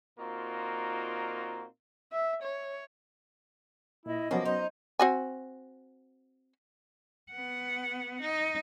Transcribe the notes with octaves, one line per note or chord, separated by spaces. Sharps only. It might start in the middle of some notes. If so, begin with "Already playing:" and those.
A#2 A#3 C4 D#4 F4 F#4
E5
C#5
A#2 E4 D#5
F3 F#3 A#3 B3 C#4
D#4 C5
C4 F#4 G#5
B3 F#5
D#4